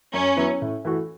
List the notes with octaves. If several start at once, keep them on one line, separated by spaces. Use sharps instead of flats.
F#2 C#4
F#3 B3 E4
A2
E3 A3 F#4